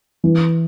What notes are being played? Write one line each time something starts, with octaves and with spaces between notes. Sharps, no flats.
E3